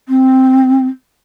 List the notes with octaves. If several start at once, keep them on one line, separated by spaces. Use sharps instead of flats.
C4